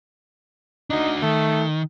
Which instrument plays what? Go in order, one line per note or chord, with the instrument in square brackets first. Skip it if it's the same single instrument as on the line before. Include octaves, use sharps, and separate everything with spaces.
[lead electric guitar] D4 F#4 [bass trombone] D#4
[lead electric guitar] D#3 [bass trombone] A3